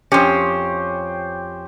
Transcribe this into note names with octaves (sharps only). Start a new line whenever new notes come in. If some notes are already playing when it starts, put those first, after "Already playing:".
F2 C#4 G4 C5